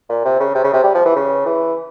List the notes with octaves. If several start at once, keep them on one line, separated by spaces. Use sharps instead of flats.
A#2
C3
C#3
C3
C#3
C3
G3
F3
E3
C#3
E3